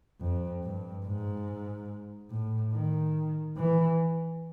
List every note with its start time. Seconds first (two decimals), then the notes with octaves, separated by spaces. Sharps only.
0.21 F2
0.63 G2
1.05 G#2
2.31 A2
2.73 D#3
3.57 E3